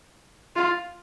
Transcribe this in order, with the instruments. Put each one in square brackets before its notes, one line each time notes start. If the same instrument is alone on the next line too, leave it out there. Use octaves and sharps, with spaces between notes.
[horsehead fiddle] F4